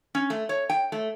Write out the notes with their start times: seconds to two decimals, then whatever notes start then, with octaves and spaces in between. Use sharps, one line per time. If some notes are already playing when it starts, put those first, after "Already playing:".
0.15 C#4
0.30 A3
0.49 C#5
0.70 G5
0.92 A3